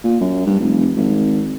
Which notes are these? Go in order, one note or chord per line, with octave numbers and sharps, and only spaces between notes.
A#2
F#2
G2
F1
G#1